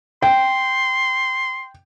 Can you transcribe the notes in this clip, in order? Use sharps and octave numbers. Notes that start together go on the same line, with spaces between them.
G5 C6